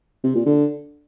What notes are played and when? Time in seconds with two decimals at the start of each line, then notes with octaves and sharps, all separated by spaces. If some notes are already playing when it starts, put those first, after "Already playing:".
0.24 C3
0.35 A#2
0.46 D3